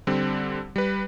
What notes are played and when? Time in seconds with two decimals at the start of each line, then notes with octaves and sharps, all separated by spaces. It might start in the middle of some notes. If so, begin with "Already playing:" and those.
0.07 D3 G3 C4
0.76 G3 B4